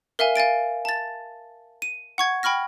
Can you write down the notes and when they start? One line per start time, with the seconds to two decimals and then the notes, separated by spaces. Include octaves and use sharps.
0.19 A#4 E5 F5 G#5
0.36 F5 G#5 A6 D7
0.85 A5 A6
1.82 D#7
2.18 F#5 C#6 G#6
2.43 G5 B5 C#6 F6 A#6